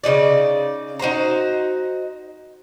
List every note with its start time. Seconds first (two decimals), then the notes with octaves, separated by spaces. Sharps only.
0.04 C#3 F3 D#4 D5
1.00 D#4 F#4 C5 A#5